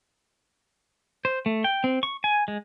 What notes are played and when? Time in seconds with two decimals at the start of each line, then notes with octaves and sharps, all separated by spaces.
1.25 C5
1.46 A3
1.64 G5
1.84 C4
2.03 C#6
2.24 G#5
2.48 G#3